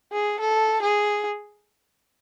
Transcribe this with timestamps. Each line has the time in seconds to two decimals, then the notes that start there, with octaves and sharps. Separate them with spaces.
0.12 G#4
0.40 A4
0.82 G#4